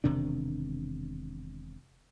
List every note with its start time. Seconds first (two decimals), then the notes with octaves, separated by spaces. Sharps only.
0.04 E1 C3 D#3 D4